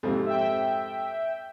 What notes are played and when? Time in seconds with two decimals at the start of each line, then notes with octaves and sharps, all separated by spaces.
0.03 F2 G#2 C3
0.26 E5 G5